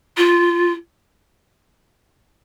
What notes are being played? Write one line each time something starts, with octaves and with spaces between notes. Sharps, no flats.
F4